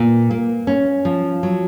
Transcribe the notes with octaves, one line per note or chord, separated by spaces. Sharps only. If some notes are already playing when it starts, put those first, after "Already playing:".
Already playing: A#2
A#3
C#4
F3
F#3